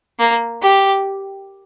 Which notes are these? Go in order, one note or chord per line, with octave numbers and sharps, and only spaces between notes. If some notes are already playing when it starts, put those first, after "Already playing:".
A#3
G4